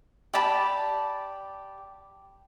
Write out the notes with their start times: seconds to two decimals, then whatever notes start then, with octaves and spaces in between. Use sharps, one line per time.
0.34 G4 D5 A5 B5